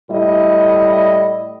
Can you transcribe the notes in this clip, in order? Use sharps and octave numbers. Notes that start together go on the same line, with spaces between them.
A2 G3 E4 D#5